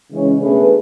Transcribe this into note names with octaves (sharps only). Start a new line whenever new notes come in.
C#3 E3 G#3 C#4
B2 A3 D4 G#4 B4